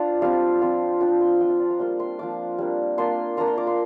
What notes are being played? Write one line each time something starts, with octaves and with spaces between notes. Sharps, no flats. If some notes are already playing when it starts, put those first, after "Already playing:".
Already playing: D4 F4 C5 D5
G3 C4 F4 F5
F3 C4 F4
F3 D4 F4 G5
C6
F3 C4 F4 G5
F5
D5
A#5
G3 A#3 F4 C6
C6
F3 A#3 D4 F4 D6
G3 A#3 D4
A#3 D4 F4 C6
A#3 D4 F4 A#5
C6
D6
C6